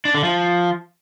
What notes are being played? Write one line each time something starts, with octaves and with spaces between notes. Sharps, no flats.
D4
D3
F3